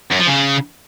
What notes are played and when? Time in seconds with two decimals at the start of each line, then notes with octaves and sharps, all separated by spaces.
0.11 F#2
0.19 F3
0.27 C#3